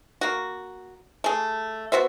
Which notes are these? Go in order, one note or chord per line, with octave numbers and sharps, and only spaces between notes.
A#3 F#4
A3 G#4
B3 F#4 C5 E5